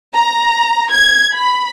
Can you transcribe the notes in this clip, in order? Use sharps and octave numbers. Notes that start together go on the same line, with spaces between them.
A#5
G#6
B5